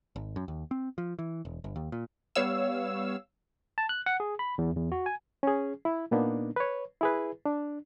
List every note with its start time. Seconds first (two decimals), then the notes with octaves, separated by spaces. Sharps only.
0.16 G#1
0.36 F#2
0.48 D#2
0.71 C4
0.98 F3
1.19 E3
1.45 E1
1.64 G1
1.76 D#2
1.92 A#2
2.35 G3 B3 C#5 F5 E6
3.78 A5
3.89 F#6
4.06 F#5
4.20 G#4
4.39 B5
4.58 E2
4.77 E2
4.92 F#4
5.06 G#5
5.43 C#4 G#4
5.85 E4
6.11 A#2 A#3 B3 D4 D#4
6.56 B4 C#5
7.01 E4 G#4 B4
7.46 D4